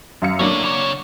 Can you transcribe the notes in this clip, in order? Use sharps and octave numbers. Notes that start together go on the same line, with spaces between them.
F#2 F5 C#7
F#3 A#3 D4 A4 C#5
C#3 C#5